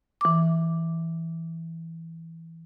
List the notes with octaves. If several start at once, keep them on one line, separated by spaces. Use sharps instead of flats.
E3 D6